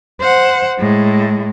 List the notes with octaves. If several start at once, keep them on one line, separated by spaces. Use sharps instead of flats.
C5 F#5
A2 G#3